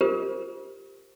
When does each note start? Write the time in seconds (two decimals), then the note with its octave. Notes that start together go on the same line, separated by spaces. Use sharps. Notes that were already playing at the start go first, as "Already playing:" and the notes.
0.01 F4 G4 A#4 C5